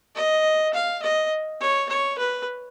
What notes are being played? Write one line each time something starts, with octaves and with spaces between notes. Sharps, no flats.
D#5
F5
D#5
C#5
C#5
B4